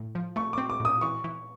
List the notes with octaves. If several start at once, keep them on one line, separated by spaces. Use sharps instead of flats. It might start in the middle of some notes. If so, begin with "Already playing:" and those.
Already playing: A2
F3
A3 C#6
D6
C4
D6
A2 D#6
E3 C#6
E3